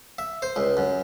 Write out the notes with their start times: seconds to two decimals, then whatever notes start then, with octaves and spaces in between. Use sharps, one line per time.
0.18 E5
0.42 C5
0.56 C#2
0.77 F#2